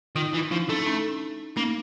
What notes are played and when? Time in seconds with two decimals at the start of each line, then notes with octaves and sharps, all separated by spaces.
0.15 D#3 D#4 F4
0.34 E3
0.51 F3 D4 E4
0.69 A3 C#4 D#4
0.87 C#4 D#4
1.56 A#3 C#4 D#4